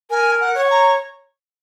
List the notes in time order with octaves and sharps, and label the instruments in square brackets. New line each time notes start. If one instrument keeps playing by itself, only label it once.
[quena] A#4 [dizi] G#5
[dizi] F#5
[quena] C#5
[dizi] A#5